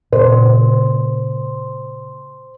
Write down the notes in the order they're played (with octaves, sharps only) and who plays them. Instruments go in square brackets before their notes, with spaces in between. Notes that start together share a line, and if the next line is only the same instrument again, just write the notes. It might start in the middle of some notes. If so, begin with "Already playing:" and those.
[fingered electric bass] A#2 C#3 [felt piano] C5